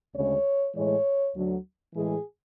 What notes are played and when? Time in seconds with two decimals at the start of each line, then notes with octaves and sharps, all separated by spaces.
0.14 D2 C#3 G#3 C#5
0.74 A2 E3 G#3 C#5
1.34 D2 D3 F#3
1.95 A2 E3 G#3 G#4